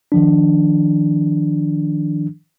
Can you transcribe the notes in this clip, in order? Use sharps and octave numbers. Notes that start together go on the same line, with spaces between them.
D#3 F3 D4